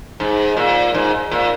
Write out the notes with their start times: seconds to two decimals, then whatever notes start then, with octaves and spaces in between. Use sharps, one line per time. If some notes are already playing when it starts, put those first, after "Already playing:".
0.20 G#2
0.57 A#2
0.95 G#2
1.31 A#2